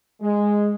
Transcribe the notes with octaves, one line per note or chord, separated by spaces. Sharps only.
G#3